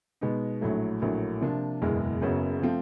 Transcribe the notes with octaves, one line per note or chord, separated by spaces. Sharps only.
B2 G#3 B3 D#4
A#1 A2 F#3 A3
A#1 A2 F#3 A#3
C3 F3 A#3 D4 F4
F#1 E2 B2 G#3
F#1 F#2 C#3 F#3 B3
F3 A3 C4 F4